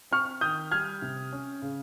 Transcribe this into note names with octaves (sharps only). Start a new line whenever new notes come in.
C4 C#6 F6
D#3 D#6 G6
G3 F6 G#6
C3
C#4
C#3